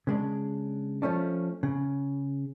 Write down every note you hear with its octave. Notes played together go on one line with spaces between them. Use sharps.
C#3 G#3 D4
F3 A3 C#4 D4
C#3